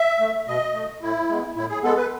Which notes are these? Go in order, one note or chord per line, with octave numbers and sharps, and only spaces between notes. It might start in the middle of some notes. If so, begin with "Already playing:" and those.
Already playing: E5
A3
B2 D#5
A3
A2 E4
G#3 B3
A2 E4
G#4
G#3 B3 A4
B4